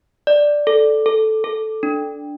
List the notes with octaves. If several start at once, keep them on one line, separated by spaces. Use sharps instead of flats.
D5
A4
A4
A4
D4